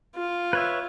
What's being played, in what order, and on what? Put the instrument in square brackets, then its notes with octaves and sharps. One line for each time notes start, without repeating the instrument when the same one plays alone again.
[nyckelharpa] F4
[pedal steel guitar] B4 C#5 E5